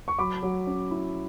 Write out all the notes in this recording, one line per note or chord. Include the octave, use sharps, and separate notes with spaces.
C#6
F#3 B5 D6
F#3
C#4
E4